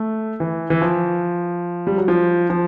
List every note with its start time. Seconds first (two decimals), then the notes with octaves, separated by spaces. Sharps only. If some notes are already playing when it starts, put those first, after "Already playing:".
Already playing: A3
0.40 E3
0.70 E3
0.82 F3
1.87 G3
1.98 F#3
2.08 F3
2.50 F3